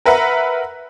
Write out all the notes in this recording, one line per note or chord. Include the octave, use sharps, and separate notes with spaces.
A#4 B4 E5 F#5 A#5